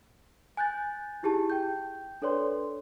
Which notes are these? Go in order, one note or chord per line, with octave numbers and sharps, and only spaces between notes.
G#5 F#6 G6 A6
D#4 E4 G4 G#4 A5
G5 G6
D4 A4 B4 C#5 D5 C6